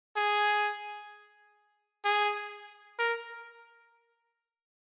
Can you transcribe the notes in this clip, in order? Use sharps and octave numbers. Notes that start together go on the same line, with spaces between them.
G#4
G#4
A#4